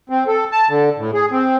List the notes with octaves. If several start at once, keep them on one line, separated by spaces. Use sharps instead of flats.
C4
A4
A5
D3
A2
G#4
C4